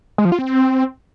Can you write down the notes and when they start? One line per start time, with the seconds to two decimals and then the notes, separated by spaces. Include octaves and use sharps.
0.18 G#3
0.25 F3
0.32 F4
0.39 C4